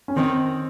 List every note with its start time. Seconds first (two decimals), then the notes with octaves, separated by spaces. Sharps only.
0.08 C#4
0.16 D#3 C4